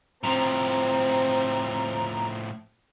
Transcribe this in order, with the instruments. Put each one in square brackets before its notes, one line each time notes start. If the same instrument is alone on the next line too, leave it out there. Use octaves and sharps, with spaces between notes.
[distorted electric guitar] A2 F3 [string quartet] C4 [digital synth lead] A#5